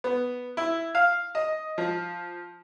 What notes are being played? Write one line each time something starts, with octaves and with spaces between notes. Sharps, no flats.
B3
E4
F5
D#5
F3